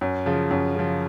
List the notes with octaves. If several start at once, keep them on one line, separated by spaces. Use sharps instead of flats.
F#2
C#3 F3
F#2
C#3 F3